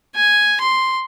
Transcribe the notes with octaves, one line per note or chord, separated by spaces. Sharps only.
G#5
C6